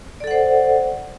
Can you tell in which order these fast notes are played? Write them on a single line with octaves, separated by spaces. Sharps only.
D5 A4 F#5 C5